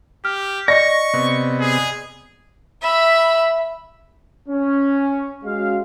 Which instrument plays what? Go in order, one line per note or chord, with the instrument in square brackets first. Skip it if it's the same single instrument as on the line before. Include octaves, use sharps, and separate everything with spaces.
[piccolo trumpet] G4 [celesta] F6
[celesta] D5 D#5 C#7 [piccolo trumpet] C#6 [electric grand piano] A#6
[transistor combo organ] C3 B3
[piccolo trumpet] G#4
[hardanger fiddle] E5 B5
[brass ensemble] C#4
G#3 C#4 F#4 F5